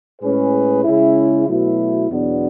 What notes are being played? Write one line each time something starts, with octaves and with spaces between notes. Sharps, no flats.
A2 G#3 C#4 G#4 B4
C#3 G#3 C#4 E4
B2 F#3 A3 E4
E2 B2 F#3 B3 D4